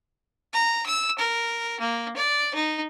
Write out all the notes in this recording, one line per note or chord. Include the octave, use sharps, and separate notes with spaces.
A#5
E6
A#4
A#3
D5
D#4